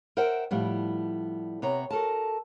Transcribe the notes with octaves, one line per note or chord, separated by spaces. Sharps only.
A#4 C5 E5 F#5 G5
A2 F3 G3 B3
C3 B3 C#5 A#5
F#4 A4 A#4 A5